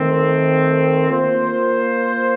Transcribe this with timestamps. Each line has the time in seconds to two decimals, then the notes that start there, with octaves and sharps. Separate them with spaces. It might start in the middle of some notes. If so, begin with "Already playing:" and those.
Already playing: D#3 A3 C4
1.09 A#3 F4 C5